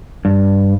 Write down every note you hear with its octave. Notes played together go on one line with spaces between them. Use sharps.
G2